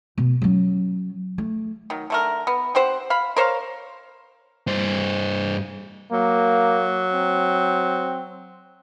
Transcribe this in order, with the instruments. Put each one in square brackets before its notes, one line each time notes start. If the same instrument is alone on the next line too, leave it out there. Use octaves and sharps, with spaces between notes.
[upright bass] B2
F#3 C#4
A3
[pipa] D#3 F#3
D3 A3 A#4
B3
C4 G4 C5 F#5
F5 B5
A#4 C5 C#5 F5
[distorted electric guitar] G2 C5
[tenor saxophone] F#3 [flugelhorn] A#3
[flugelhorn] C4